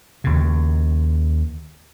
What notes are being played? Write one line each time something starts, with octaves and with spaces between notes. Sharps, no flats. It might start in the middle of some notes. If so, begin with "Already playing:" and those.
D#2 C#3